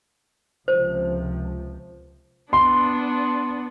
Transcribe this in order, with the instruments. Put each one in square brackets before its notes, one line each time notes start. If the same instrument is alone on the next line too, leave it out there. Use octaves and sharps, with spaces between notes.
[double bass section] C#2 C3 F3 [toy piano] C5
[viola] B3 D4 [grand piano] C6